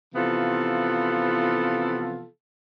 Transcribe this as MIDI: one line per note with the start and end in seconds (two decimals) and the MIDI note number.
0.15 2.26 48
0.15 2.26 52
0.15 2.26 53
0.15 2.26 59
0.15 2.26 65
0.15 2.26 69